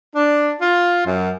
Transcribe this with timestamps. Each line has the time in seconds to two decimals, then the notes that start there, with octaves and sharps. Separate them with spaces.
0.16 D4
0.61 F4
1.06 F#2